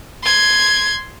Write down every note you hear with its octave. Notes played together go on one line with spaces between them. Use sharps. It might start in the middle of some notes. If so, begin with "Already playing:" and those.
C6 G#6